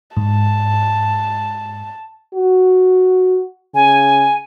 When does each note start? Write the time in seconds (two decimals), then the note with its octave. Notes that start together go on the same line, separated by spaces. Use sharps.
0.17 G#2 A5
2.34 F#4
3.75 C#3 G#5